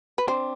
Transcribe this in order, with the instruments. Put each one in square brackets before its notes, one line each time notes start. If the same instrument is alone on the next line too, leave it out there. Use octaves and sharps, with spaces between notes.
[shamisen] B4
[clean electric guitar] C4 D4 [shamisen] C5